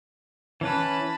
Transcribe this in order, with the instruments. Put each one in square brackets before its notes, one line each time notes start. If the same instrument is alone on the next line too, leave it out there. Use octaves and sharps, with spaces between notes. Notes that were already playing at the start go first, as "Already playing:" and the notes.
[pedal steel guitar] E3 C#4 B4 [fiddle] A5 B5